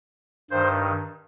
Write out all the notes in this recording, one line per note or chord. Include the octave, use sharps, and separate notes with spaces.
G2 D#3 C5